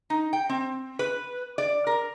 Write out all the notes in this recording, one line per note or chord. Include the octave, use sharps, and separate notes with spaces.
D#4
G5
C4
B4
D5
A#4